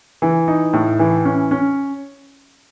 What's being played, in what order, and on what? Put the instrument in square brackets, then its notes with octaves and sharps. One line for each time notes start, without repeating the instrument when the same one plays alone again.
[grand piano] E3
D#4
A2
E3
C#4
C#4